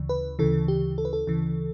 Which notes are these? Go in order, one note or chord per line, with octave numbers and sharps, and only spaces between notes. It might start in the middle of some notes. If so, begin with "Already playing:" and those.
Already playing: D2 C#3 E3
B4
D2 C#3 E3 A4
G4
A4
B4
A4
D2 C#3 E3